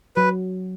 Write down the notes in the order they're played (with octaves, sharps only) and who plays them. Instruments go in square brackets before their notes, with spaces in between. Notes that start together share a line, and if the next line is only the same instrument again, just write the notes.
[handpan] F#3 [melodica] B4